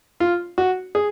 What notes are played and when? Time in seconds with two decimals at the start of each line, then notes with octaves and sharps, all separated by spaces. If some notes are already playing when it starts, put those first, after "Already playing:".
0.20 F4
0.58 F#4
0.95 G#4